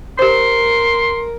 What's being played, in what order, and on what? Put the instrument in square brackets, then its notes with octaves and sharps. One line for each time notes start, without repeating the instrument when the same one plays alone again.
[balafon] G4 C5 [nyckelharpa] A#4 [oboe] C6